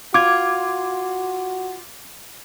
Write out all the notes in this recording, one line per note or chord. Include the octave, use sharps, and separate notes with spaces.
F4 F#4 D6 G#6